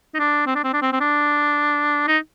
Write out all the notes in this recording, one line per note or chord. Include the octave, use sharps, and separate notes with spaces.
D#4
D4
C4
D4
C4
D4
C4
C4
D4
D#4